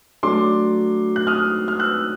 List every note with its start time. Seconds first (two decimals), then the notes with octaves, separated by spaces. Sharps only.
0.23 F#3 A3 D4 C6 D6
1.16 F#6
1.27 D#6 F6
1.68 F6
1.79 E6 F#6